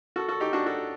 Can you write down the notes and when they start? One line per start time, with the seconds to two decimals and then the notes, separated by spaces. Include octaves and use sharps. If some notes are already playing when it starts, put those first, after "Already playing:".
0.16 F#4 A4
0.28 F#4 A4
0.40 D#4 G4
0.53 D4 F#4
0.66 F#4 A4